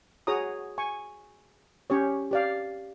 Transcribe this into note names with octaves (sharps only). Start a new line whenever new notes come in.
F#4 G#4 C#5 A#5 D#6
G#5 C#6
C#4 G4 C#5
G4 D5 F5